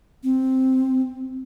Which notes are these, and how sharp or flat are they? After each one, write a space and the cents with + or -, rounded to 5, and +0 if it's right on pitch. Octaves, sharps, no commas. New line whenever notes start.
C4 +0